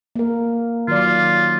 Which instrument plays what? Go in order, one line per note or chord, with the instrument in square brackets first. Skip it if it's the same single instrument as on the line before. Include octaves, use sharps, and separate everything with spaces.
[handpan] A#3 A#4
[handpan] D#3 F#3 D5 [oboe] F4